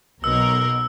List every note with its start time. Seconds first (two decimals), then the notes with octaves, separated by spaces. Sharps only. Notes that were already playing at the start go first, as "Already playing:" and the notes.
0.24 B1 B2 A#4 E6